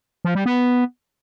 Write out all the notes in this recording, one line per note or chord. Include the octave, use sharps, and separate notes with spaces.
F3
G3
B3